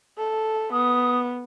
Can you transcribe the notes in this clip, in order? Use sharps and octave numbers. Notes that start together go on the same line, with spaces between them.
A4
B3 D#6